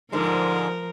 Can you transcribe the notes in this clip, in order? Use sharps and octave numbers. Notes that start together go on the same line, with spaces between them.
G#2 D3 F3 G#3 A#4